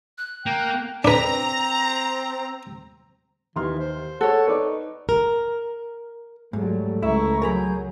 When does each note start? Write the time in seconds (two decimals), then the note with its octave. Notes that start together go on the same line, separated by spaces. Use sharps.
0.18 F#6
0.46 A#3 G5
1.05 C4 D4 B4 A#5
3.56 D#2 E3 C6 F6
3.79 C5
4.21 G#4 A4 C#5 F#5
4.47 D#4 B4 D5 D6
5.09 A#4
6.53 G#2 F#3 G3 A3
7.02 C#2 E4 E5 A#5 C#6 E6
7.42 F#3 G#4 A#4 A#5 B5 G6